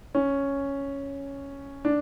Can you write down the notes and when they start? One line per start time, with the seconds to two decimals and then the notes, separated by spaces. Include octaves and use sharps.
0.15 C#4
1.85 D4